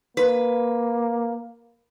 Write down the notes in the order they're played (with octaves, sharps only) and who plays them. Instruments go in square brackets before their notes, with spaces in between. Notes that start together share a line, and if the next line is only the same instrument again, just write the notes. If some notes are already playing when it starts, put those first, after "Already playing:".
[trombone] A#3 [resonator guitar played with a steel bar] B4